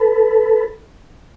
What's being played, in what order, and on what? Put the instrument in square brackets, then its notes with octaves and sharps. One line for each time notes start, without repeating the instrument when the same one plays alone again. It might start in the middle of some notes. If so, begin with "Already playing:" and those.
Already playing: [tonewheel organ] A4 B4